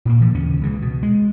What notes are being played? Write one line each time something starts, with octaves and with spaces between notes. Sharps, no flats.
A#2 A#3
E3 F3
D#2 C#3 C#4
C#2 C#3 E3
B2
G#3